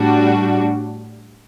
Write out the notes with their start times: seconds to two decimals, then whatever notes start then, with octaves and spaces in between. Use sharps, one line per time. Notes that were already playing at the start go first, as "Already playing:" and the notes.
Already playing: A2 G3 D4 F#4